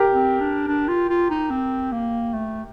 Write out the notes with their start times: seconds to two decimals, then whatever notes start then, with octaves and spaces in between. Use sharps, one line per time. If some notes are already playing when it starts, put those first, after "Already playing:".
Already playing: G4 A#4
0.13 C4
0.41 D4
0.68 D4
0.88 F4
1.09 F4
1.30 D#4
1.50 C4
1.92 A#3
2.34 A3